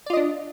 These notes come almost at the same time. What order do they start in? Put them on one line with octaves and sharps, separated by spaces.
D5 F4 D#5 D4